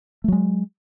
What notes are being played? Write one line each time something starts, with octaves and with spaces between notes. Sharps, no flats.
F#3 G#3 A3